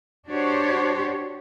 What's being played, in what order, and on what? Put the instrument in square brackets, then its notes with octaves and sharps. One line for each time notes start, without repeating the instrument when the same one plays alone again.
[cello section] D4 F#4 G4 C5 C#5